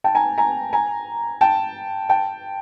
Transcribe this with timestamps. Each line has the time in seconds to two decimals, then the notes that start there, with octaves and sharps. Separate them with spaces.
0.04 G5 A5
0.15 G#5 A#5
0.38 G#5 A#5
0.73 G#5 A#5
1.41 G5 A5
2.09 G5 A5